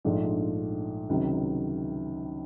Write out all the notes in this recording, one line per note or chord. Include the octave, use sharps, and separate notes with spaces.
A#1 G#2 F3 A3 D4
C#2 C3 D#3 F#3